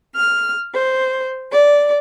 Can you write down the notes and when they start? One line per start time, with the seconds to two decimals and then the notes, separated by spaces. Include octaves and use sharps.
0.14 F6
0.74 C5
1.51 D5